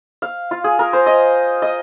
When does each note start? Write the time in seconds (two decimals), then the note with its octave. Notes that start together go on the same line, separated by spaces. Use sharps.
0.22 F5
0.51 F4
0.64 G#4
0.79 A#4
0.93 C5
1.06 D#5
1.62 D#5